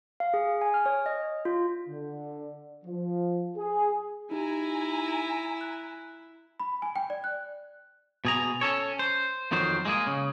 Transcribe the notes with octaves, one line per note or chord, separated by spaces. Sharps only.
F5
G#4
G#5
F6
C#5
D#5
F4
D3
F3
G#4
D#4 E4 G4 G#5 A#5
F#6
B5
G#5
G5
D5
F#6
B2 G#4 A#5
C#4 A4 C#5
C5
F2 D#3 F#3 C5
G#3 A#3 G#4
C#3